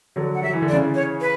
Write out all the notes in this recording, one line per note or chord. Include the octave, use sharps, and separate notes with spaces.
D3 F#3
F#5
F#3 E5
E3
D3
D5
C#3 E3
C#5
B4